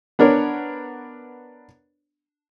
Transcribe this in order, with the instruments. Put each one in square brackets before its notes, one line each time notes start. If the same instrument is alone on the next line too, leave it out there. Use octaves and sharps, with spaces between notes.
[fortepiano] B3 D4 A#4 C#5